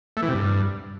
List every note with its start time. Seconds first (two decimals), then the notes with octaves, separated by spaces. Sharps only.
0.17 A3
0.23 E3
0.28 C3
0.34 G2